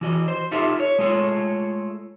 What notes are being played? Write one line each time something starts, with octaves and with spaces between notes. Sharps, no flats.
E3 F#4 D#5
C5
D#4 F4 G4 A4 E5
C#5
G#3 A3 F4 C#5